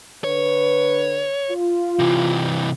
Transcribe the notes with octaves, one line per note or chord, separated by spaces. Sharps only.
D3 B4 C#5
F4
C3 E3